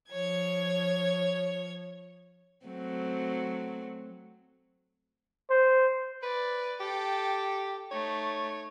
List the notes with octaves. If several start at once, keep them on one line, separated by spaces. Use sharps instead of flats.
F3 C#5 G#6
F#3 A3 C4
C5
B4 D5
G4 A4 G5
A3 D#4 C#5